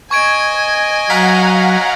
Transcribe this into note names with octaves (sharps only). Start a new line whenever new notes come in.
D#5 G#5 C#6 G#6 D7
F#3 F5 F#5 A#5 B6